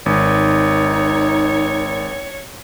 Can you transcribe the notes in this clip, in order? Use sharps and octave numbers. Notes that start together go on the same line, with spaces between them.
G#1 D#4 C#5